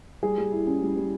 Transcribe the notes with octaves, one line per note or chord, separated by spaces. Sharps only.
G3 G#4
G3
E4
C#4
G3
G3